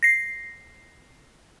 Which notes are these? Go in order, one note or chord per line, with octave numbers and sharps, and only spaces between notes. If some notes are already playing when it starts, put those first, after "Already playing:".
A#6 C7